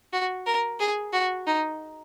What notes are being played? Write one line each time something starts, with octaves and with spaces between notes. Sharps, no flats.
F#4
A#4
G#4
F#4
D#4